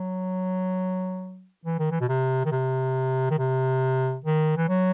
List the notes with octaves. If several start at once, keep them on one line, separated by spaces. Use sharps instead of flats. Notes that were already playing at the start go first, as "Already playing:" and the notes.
Already playing: F#3
E3
D#3
E3
B2
C3
D#3
C3
D#3
C3
D#3
E3
F#3